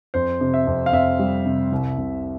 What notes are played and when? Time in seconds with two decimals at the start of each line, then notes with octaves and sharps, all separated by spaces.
0.14 F2 C5
0.41 C3
0.54 E5
0.67 F2
0.86 F5
0.92 F2 E5
1.19 G3
1.46 C3
1.72 C2
1.98 C2